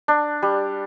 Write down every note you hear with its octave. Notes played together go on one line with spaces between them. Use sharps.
D4
G3